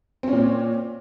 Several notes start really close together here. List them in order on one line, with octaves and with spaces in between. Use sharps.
C4 C#4 A#2